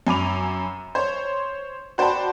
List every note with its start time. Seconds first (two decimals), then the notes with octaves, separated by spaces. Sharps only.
0.07 F#2 G#5 B5 D6 F7
0.95 C5 C#5
1.98 F#4 C5 D5 G5 A5 B5